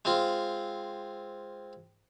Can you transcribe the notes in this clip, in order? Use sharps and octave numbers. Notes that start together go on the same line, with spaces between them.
G#3 C4 F4